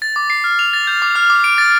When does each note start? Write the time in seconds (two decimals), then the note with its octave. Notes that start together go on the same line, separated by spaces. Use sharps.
0.02 A6
0.16 D6
0.30 C7
0.44 F6
0.59 F7
0.73 A6
0.87 G6
1.02 D6
1.15 F6
1.30 D6
1.44 D7
1.58 A6